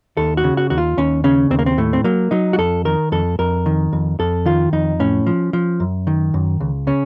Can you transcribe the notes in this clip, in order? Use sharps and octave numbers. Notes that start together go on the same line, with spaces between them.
D#2 A4
F#4
C#3
F#4
D#2 F#4
F4
D#2 C#4
C#3 C#4
D#2 C4
A#3
C4
A2 A3
C4
F#3 A#3
F#3 D#4
F#4
F2 A4
D#3 A#4
F2 A4
F2 A#4
D#3
F2
F2 A4
D#3 F4
F2 D#4
A2 C#4
F3
F3
F#2
D#3
F#2
C#2
C#3 C#4